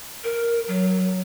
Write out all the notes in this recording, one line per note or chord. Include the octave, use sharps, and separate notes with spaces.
A#4
F#3